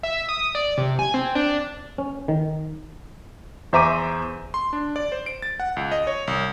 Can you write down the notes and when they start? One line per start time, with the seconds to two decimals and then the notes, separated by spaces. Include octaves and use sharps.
0.03 E5
0.29 D#6
0.55 D5
0.78 C3
0.99 G#5
1.14 C4
1.35 D4
1.98 C#4
2.28 D#3
3.73 E2 C5 E5 A#5 D6 D#7
4.54 C6
4.73 D4
4.96 D5
5.12 C5
5.26 D7
5.42 A6
5.60 F#5
5.76 C#2
5.92 D#5
6.07 C#5
6.27 C2